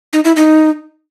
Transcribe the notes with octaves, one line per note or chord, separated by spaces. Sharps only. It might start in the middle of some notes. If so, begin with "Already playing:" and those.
D#4
E4
D#4